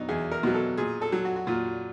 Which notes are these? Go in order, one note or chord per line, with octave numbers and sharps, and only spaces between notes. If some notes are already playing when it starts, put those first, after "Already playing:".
Already playing: B2 F#3 D4 D#4
E2 G#4
A#4
B2 F#3
A4
A#2 G#4
A4
F#3
F#4
F#4
A#2 F4